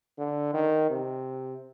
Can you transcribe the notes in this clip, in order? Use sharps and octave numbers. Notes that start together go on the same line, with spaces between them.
D3
D#3
C3